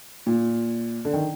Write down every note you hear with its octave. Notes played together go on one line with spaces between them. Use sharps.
A#2
D3
D#3